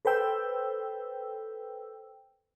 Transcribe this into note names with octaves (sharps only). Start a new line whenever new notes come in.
A4 B4 C5 G5 E6